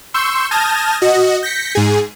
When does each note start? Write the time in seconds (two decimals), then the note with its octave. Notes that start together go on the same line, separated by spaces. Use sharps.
0.14 C6 C#6 E6 G6
0.51 A5 D#6 F6 G6 G#6 A#6
1.02 F#4 D#5
1.43 G6 A#6 B6 C#7
1.75 G#2 G#4